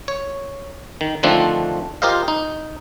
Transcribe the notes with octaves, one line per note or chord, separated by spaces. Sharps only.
C#5
D#3
D3 D#3 F3 A3 C4 D4
F4 G4 A#4 C5 D#5 F5
D#4